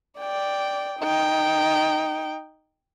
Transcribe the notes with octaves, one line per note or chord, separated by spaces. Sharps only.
D5 G5
D#4 G5